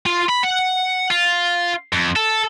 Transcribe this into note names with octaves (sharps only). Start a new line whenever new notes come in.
F4
B5
F#5
F4
F2
A4